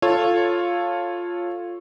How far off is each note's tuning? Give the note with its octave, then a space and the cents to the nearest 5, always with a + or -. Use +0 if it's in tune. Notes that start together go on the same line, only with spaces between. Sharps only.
F4 +0 A4 +0 C#5 -15